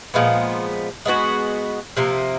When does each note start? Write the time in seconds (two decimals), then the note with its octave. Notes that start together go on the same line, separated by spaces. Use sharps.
0.14 A#2 F3 G#3 B3
1.05 G#3 B3 D4 F#4
1.97 C3 F3 A#3